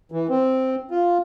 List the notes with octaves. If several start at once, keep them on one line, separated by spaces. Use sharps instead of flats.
E3
C4
F4